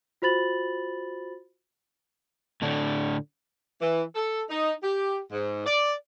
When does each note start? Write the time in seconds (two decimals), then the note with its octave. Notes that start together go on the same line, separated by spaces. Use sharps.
0.22 F4 F#4 C5 B5 A6 F#7
2.62 A2 D3 D4
3.81 E3
4.15 A4
4.50 D#4
4.83 G4
5.31 G#2
5.66 D5